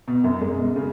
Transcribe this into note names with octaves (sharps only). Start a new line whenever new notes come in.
B2
F#2
G#3
B2
C#3